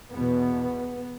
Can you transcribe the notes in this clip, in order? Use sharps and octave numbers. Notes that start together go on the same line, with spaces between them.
E2 B2 B3